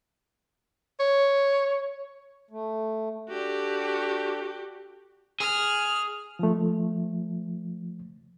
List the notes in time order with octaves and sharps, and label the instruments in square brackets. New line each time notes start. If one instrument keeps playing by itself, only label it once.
[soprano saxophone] C#5
[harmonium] A3
[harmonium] D4 A4 [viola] F#4 G4
[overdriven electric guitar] G#4 [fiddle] F6
[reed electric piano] F3 A3